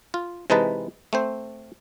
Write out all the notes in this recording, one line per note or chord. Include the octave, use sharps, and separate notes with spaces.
F4
C3 E3 G#3 D#4 B4 A5
A3 C4 C5